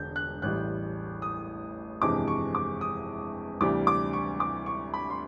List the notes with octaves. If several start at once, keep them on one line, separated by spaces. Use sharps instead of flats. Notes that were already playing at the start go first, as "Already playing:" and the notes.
Already playing: E1 D3 G6
F#6
A1 A2 E3 G3 F#6
D#6
G1 F2 C3 E3 G#3 D6
C#6
D6
D#6
D2 C3 E3 G3 D6
D6
C#6
D6
C#6
B5
C6